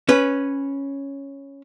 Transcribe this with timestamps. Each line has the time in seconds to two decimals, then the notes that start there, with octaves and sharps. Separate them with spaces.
0.09 C#4 B4